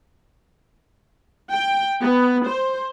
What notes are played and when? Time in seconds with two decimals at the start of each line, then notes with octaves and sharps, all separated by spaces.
1.53 G5
2.02 B3
2.47 C5